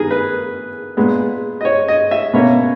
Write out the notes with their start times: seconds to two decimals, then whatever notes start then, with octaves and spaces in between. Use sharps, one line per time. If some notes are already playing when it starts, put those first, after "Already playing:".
Already playing: D#3 B3 G#4 A#4
0.11 B4
0.97 A#2 G#3 B3
1.61 D#5
1.65 C#5
1.88 D#5
2.11 E5
2.34 B2 A#3 C#4 C#5